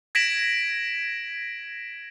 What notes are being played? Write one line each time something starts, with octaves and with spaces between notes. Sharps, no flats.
G#6 A#6 B6 D7 E7 F#7